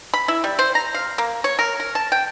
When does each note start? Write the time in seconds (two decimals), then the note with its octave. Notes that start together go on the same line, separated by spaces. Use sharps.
0.14 B5
0.28 E4
0.44 G3
0.59 C5
0.75 A#5
0.95 F5
1.18 A#3
1.44 C#5
1.59 A#4
1.80 A#4
1.95 A5
2.12 G5